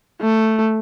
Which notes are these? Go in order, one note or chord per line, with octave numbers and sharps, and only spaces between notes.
A3